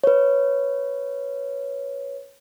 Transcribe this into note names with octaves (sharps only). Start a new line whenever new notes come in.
B4 C#5